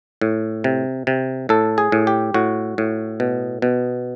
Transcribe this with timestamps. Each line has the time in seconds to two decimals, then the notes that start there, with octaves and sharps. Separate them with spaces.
0.21 A2
0.64 C3
1.07 C3
1.49 A2 A4
1.78 G#4
1.92 A2
2.07 G4
2.34 A2 F#4
2.78 A2
3.20 B2
3.62 B2